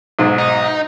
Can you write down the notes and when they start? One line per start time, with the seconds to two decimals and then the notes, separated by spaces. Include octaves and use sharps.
0.19 B1 G#2
0.38 D#4